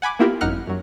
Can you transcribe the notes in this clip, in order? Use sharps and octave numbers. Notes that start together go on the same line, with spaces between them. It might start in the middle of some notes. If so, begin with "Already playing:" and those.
F#5 G#5 B5 D6
A#3 B3 E4 F4 G4 A#4
G#1 F#2 D#4 F#5 F6 F#6
F#2 F#3